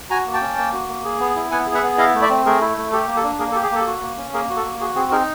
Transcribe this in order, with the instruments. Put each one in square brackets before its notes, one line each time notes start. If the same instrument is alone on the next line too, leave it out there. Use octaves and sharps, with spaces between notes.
[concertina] F#4 G#5 A#5
A#3
G5 A5
C#4
A#3
F#4
A#3
G#4
B3
E4
B3 F#5 G#5
G#4
E5 F#5
B3
E4 D#5 F5
A3
D5 E5
C4
A3 G#4 A#4
E4
A3
G4 A4
A#3
A4
D4
A#3 G#4 A#4
A4
G4
G#4
A#3 A4
F#4
A#3
C#4
A#3 G#4 A#4
F#4
A4
A#3
F#4 G#4
C4 G#4
D#4 G#4 A#4